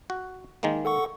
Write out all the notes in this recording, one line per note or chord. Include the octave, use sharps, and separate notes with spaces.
F#4
D#3 G#3 A#3
A4 F#5 C#6